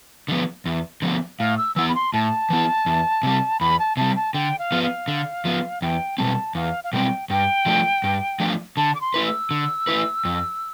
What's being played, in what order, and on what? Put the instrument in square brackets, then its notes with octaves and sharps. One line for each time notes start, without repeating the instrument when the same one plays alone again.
[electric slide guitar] D3 F3 B3
E2
D3 F3 B3
[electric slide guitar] A2 [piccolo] F5
[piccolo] E6
[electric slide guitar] E3 B3 E4 [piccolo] E6
[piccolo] B5
C6
[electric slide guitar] A2 [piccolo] A5
[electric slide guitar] E3 B3 E4
E2
C3 G3
[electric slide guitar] E2 [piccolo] B5
[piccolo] A5
[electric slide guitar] C3 G3 [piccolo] A5
[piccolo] A5
[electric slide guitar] D3 [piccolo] G5
[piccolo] F5
[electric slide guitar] F3 B3
[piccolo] F5
[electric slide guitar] D3
F3 B3
[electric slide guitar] E2 [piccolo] G5
[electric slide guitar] B2 G3 C4 [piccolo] A5
[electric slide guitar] E2 [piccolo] F5
[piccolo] F5
[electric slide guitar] B2 G3 C4 [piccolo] G5
[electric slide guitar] G2 [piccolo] G5
[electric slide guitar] F3 A3 D4
G2
F3 A3 D4
[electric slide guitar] D3 [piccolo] A5
[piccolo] D6
C6
[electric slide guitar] A3 E4 B4
[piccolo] E6
[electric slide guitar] D3
A3 E4 B4
F2